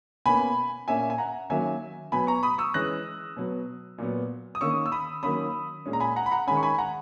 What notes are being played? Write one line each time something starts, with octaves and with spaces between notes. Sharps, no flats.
B2 A#3 C#4 G#5 B5
A#2 A#3 C#4 E5 G#5
G#5
F#5 A#5
D#3 F#3 A#3 C#4 E5 G#5
B2 F#3 B3 G#5 B5
A#5 C#6
B5 D#6
C#6 E6
E3 G#3 C#4 F#6 A#6
B2 F#3 B3
A#2 F#3 B3
D#6
D#3 A#3 C#4 C#6 E6
E6
B5 D#6
D#3 F#3 A#3 C#4 B5 D#6
A#2 G#3 C#4
A#5
G#5 B5
F#5 A#5
B5
F#5 A#5
D#3 G#3 C#4 G#5 B5
C#6
G#5 B5
F#5 A#5